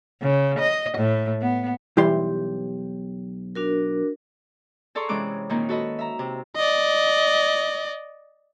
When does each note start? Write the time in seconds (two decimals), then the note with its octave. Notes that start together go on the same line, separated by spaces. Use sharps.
0.21 C#3
0.59 D#5
0.97 A2
1.41 B3
1.97 B1 E3 G3 E4 G4 C6
3.55 D4 F#4 A#4
4.95 G#4 A4 D5 A#5 C6 C#6
5.09 C3 E3 G#3 C#4 D6 F#6
5.49 A#2 D#3 A#3 C4 C#4 D#4
5.69 F#4 A4 B4 D#5
5.99 E5 A#5
6.19 C3
6.56 D5 D#5